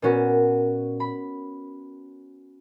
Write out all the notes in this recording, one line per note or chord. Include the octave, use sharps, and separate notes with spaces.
A#2 B3 C#4 F#4
B5